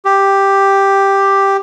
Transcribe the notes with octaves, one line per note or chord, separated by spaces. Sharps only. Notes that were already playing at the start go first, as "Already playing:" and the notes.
G4